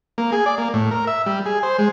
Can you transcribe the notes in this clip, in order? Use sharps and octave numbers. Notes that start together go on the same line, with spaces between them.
A#3
G#4
D5
A#3
A2
A#4
E5
G3
G#4
C5
G#3